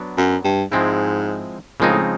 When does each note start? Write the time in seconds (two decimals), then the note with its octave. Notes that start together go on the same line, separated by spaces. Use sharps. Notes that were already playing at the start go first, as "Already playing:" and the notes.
Already playing: F#3 B3 D4
0.18 F#2
0.44 G2
0.72 G#2 F3 G#3 C4 E4
1.80 A#2 C#3 F3 G#3 C4 D#4
1.89 A2